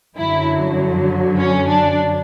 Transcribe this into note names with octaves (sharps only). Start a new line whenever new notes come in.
F#2 D3 F#3 E4
C#4
D4